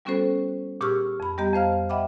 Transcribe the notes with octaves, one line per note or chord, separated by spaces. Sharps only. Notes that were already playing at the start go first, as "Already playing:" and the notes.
G3 B3 C#4 F#4 A4 C5
A#2 G4 G#4 C#6 E6 F6
F2 B5
G3 B3 G4 D#5 A#5
F2 C5 F5 F6
D#5 E5 F#5 G5 B5 D6